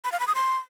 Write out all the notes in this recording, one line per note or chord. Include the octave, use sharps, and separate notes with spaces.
B5
F5
B5
D#6
C6